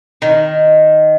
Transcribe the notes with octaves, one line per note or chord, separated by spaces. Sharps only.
D#3